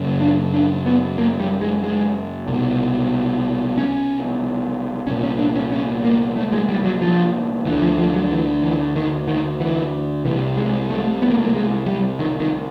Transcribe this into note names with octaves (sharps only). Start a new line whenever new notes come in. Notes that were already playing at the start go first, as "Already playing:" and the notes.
Already playing: F#2 C#3
D4
D4
B3
A#3
G3
G#3
G#3
C2 B2
C#4
C2 A#2 C#4
C#4
D4
C#4
C#4
A#3
A3
G#3
G3
F#3
F3
D2 D3 E3
F3
F3
F#3
E3
E3
D#3
D#3
E3
C2 C3 E3
G#3
A3
B3
A#3
A3
A#3
G#3
G3
D#3
D#3